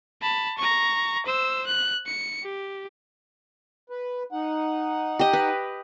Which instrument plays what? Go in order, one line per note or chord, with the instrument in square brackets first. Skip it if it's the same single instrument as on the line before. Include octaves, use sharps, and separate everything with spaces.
[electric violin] A5 B5
A#5 C#6
C5 E6
F#6
C#7
G4
[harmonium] B4
D#4 F#5
[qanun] G4 D#5
B4